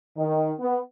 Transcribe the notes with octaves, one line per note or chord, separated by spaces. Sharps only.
D#3
B3